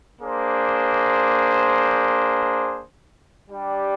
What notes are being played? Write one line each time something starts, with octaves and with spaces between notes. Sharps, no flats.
A#3 D4 G#4 C5
G3 D4 G4 D5 G5